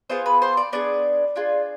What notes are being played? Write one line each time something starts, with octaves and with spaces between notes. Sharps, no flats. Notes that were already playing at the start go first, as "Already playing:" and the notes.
B3 F4 G#4 C5
B4
C5
D5
B3 D4 G#4 D5
D4 F4 G#4